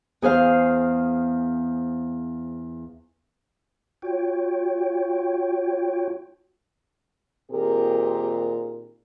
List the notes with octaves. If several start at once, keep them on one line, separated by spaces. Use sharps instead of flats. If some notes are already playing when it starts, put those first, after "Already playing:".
E2 G#4 C5 F5
F4 F#4 C#5 G5
A#2 D#3 C4 G4 G#4 A#4